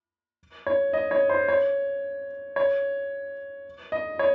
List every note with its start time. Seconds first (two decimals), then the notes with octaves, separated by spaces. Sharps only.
0.66 C#5
0.93 D#5
1.11 C#5
1.29 C5
1.48 C#5
2.56 C#5
3.92 D#5
4.19 C#5